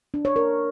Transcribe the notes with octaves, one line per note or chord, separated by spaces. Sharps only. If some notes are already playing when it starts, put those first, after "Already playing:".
D4
C#5
A#4